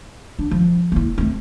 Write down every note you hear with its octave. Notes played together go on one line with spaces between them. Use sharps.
D4
F3
A#3 E4
A3 C4